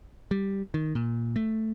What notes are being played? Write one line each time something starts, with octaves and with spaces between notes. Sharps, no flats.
G3
D#3
A#2
A3